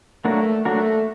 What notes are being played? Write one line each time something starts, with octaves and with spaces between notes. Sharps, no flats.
F#3 A3 A#3 D4 F#4 A#4
F#3 A3 A#3 D4 F#4 A#4